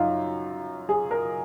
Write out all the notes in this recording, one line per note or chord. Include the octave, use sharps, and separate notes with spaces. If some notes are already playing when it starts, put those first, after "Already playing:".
Already playing: F#2 D#4 F4
G#4
A#4